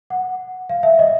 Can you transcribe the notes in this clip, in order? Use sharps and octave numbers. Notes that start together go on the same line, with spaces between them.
F#5
F5
E5
D#5